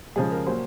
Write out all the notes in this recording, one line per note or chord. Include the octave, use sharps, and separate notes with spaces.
C#3 F3 G#3 G#4
A#4
A#2 F#3 A#3 C5